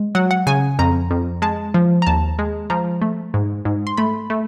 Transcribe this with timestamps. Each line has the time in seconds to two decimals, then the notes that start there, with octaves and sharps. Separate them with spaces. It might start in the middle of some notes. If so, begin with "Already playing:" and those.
Already playing: G#3
0.15 F#3 F#5
0.31 F#5
0.47 C#3 G#5
0.79 F2 A#5
1.11 F2
1.42 G#3 A5
1.74 F3
2.02 A#5
2.07 D#2 A5
2.39 G#3
2.70 F3 A#5
3.02 A3
3.34 G#2
3.65 G#2
3.87 C6
3.97 A3 B5
4.30 A3